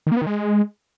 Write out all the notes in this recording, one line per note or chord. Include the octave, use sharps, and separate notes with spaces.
D#3
A#3
B3
D#3
G#3